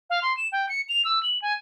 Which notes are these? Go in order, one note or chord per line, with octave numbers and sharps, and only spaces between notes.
F5
C6
E7
G5
C#7
F7
E6
F#7
G#5